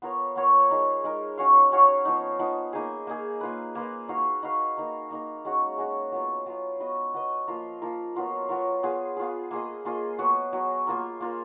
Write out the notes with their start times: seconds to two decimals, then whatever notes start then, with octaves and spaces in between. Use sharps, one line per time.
0.02 B3 F4 A#4 C#5
0.36 B3 F4 A#4 C#5
0.70 G#3 D#4 A#4
1.04 G#3 D#4 A#4
1.37 C#4 F#4 C#5 F5
1.72 C#4 F#4 C#5 F5
2.05 F3 B3 D#4
2.39 F3 B3 D#4
2.73 A#3 D#4 G#4
3.07 A#3 D#4 G#4
3.41 A#3 F4 B4
3.75 A#3 F4 B4
4.08 D#4 F#4 B4 F5
4.43 D#4 F#4 B4 F5
4.77 A#3 D#4 A#4
5.11 A#3 D#4 A#4
5.45 G#3 C#4 F#4
5.78 G#3 C#4 F#4
6.12 F#3 B3 F4
6.46 F#3 B3 F4
6.80 B3 F#4 B4 D#5
7.14 B3 F#4 B4 D#5
7.47 F3 A#3 F4 A#4
7.82 F3 A#3 F4 A#4
8.15 F#3 B3 F4 A#4
8.49 F#3 B3 F4 A#4
8.83 B3 F4 G#4
9.16 B3 F4 G#4
9.51 A#3 F4 G#4 D#5
9.85 A#3 F4 G#4 D#5
10.19 F#3 B3 F#4
10.53 F#3 B3 F#4
10.87 A#3 F4 A#4
11.20 A#3 F4 A#4